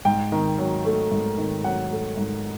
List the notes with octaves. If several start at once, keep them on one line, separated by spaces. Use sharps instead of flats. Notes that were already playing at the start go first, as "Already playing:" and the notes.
G#2 G5
D#3
F#3
A3
G#2
D#3
F#3 F#5
A3
G#2